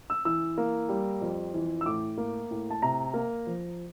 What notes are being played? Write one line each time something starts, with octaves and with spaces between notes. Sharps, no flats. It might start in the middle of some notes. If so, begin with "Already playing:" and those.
E6
E3 E6
A#3
G3
F2
E3
E6
A2 D6
A#3
A2
A5
C3 A#5
A#3
F3